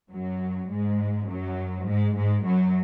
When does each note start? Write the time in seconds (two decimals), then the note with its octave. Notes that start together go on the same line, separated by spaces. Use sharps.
0.12 F#2 F#3
0.70 G#2 G#3
1.28 F#2 F#3
1.87 G#2 G#3
2.17 G#2 G#3
2.46 F#2 F#3